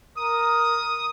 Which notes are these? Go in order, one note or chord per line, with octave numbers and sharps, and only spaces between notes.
A#4 D#6